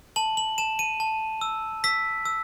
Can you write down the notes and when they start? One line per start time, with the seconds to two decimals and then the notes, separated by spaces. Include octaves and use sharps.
0.16 A5 F#7
0.37 F#7
0.58 A5 E7
0.79 D#7
1.00 A5
1.41 E6
1.84 E6 B6
2.25 E6